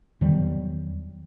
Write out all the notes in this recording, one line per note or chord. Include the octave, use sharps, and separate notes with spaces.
E2 D#3 F#3 G3